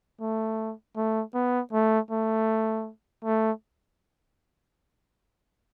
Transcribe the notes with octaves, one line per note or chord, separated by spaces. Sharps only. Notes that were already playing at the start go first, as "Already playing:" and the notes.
A3
A3
B3
A3
A3
A3